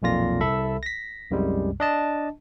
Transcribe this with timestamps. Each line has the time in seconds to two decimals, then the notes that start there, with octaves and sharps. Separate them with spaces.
0.02 B1 F2 A#2 F4 A#6
0.41 C2 A4 E5 B5
0.83 A#6 B6
1.30 C2 F#2 C3 G3 G#3
1.80 D4 D#5 A5